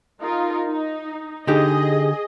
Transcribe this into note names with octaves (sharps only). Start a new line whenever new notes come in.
D#4 F4 A#4
D#4
D3 D#4 G4 G#4 D#5